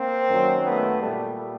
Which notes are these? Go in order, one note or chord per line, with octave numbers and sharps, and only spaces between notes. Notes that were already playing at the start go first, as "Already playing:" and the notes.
Already playing: A#3 C4
F#2 D#3 F#3
A3 B3
A#2 G3 A3